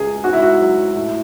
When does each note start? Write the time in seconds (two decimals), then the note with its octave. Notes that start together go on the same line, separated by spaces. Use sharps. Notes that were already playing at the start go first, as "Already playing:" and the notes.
Already playing: C#2 G#4
0.24 G#2 F#4
0.33 E4
0.42 F#4
0.60 F#3
0.96 A2